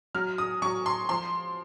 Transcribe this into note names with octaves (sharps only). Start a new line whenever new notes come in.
F#3 F6
D#6
F#3 C#6
C6
F3 C6